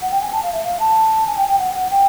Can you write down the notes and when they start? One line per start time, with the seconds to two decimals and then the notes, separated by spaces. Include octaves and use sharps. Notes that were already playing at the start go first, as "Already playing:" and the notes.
0.02 F#5
0.11 G5
0.22 G#5
0.32 A5
0.43 F5
0.53 E5
0.64 F5
0.80 A5
1.27 G#5
1.37 G5
1.49 G5
1.59 F#5
1.75 F#5
1.91 G5